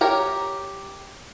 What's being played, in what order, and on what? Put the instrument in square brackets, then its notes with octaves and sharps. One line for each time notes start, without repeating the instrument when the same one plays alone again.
[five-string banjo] G4 A#4 C#5